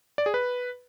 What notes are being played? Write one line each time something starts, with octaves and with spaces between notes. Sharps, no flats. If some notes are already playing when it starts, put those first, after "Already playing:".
D5
G#4
B4